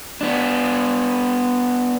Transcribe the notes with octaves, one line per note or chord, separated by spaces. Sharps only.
B3 D4